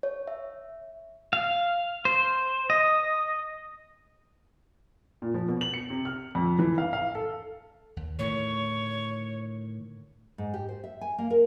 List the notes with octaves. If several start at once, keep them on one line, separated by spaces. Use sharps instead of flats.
C#5
E5
F5
C5
D#5
A#2
F3
B2
F#7
C#7
C3
F6
F2
E3
F5
F5
A4
D#2
A2 D3 D#3 C#5
G#2
G4
C5
E5
G#5
A#3
A#4